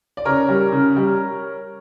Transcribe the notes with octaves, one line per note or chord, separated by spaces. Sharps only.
D5
C#3 A#4 C#5
G3
C#3
G3